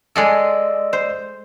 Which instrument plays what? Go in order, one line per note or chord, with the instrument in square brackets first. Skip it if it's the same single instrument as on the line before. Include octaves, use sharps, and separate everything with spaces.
[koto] G#3 G#4 A4 [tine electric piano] D5 D#5 E6
[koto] C5